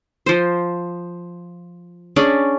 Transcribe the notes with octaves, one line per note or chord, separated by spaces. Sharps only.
F3 C5
C#4 D4 G#4 D5